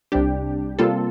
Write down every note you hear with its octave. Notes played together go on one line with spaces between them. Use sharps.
C2 C3 G3 D4 G4
C3 G3 A#3 F4 A4